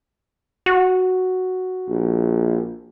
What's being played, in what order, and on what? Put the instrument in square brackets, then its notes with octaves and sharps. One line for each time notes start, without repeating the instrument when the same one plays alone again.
[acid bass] F#4
[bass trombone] A#1